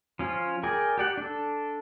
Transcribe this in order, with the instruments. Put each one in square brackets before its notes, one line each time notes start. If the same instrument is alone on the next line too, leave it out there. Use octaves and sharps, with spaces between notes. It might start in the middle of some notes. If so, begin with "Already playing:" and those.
[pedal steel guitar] F3 C#4 F4
G#4 A#4 D5 G5 G#5
G4 D5 F#5
D4 A4